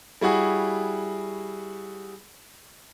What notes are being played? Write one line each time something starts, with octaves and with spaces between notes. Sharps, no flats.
G3 E4 F#4 G#4